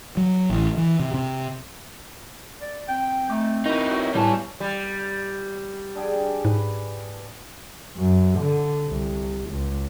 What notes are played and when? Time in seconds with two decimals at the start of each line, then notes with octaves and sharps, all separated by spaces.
0.17 F#3
0.50 A1
0.77 E3
1.00 C3
1.14 C3
2.62 D5
2.88 C4 G5
3.30 A3 D#4 D6
3.66 B2 D#4 E4 A#4 C#6
3.86 G2 F#3 F#4
4.15 A2 G3 G#5 A5
4.60 G3
5.95 D4 G#4 G5
6.45 G#2 B4
7.97 F#2
8.39 D3
8.87 C2
9.51 C#2